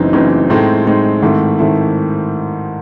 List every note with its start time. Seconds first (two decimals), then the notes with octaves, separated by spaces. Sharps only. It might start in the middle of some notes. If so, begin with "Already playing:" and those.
Already playing: F#1 F#2 E3 C4 D#4
0.13 F#1 F#2 E3 C4 D#4
0.50 A2 G#3 C4 D#4
0.85 A2 G#3 C4 D#4
1.22 G#2 D#3 A3 C4 E4
1.59 D#3 A3 C4 E4